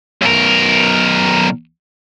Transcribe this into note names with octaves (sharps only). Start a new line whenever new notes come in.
B1 A#4